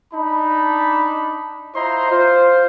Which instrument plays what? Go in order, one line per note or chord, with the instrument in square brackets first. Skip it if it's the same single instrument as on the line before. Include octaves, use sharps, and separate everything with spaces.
[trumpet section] D4 D#4 A5 B5
E4 F4 C5 D#5 A#5 C6
F4 C5